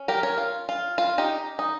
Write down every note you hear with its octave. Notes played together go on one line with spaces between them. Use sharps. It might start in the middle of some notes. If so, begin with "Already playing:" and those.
Already playing: C#4
G4 A#4
A#4 C#5
F4
F4
F4
D#4 G4
D#4